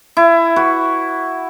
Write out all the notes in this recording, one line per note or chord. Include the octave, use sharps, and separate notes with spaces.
E4
F#4 B4